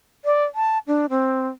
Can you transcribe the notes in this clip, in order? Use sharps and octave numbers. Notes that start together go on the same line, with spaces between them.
D5
A5
D4
C4